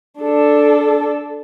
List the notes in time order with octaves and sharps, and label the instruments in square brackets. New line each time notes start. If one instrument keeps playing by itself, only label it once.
[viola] D4 A4